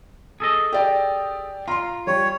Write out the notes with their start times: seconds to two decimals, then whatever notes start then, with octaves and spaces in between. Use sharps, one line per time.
0.40 G#4 A4 D#5
0.73 G4 D5 G5
1.68 F4 A#5 C6
2.07 G3 C#5